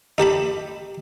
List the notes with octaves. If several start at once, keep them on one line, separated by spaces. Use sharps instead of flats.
D#4 G4 A5 B5